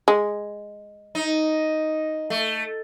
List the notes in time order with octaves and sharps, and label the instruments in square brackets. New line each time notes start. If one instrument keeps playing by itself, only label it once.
[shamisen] G#3
[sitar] D#4
A3